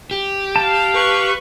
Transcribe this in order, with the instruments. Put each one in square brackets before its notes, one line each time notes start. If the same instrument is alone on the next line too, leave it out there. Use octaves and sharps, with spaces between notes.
[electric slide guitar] G4
[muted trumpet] F5 [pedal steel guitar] A5
[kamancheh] B4 C#6